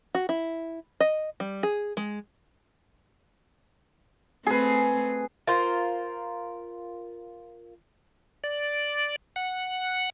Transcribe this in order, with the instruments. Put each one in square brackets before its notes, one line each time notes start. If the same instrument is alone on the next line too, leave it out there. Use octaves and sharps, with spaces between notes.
[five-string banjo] F#4
E4
D#5
G3
G#4
G#3
[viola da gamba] A3 C4 [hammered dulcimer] G#4 B4
[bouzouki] F4 A#4 C5
[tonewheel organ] D5
F#5